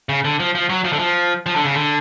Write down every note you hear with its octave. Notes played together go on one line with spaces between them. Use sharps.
C#3
D3
F3
F3
F#3
F3
D3
F3
F3
D3
C#3
D3